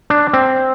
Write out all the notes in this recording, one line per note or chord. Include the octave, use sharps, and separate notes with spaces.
D4
C4